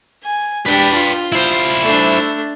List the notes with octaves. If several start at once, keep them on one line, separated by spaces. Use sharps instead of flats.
G#5
D4 G4 B4 G5
F4
E4 C5
A3 D4